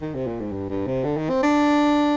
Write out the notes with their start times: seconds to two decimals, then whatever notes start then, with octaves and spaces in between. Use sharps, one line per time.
0.01 D#3
0.14 C3
0.27 A#2
0.40 G#2
0.52 G2
0.70 G2
0.87 C3
1.04 D3
1.17 D#3
1.30 C4
1.43 D4